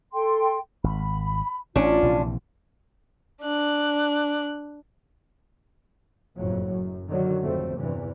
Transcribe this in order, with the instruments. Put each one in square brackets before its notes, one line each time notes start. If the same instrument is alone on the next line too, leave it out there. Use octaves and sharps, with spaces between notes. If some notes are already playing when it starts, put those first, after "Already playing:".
[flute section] A4 G5 C6
[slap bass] G#1 [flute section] B5
[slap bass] A1 [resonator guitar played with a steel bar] C#4 D4 [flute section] F4
[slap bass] A#1 C3 E3
[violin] D4 F#6
[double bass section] F#1 F2 A2 F#3
F#2
D3 D#3 F#3
G#1 F2 A3 C4
E2 G2 C3 E3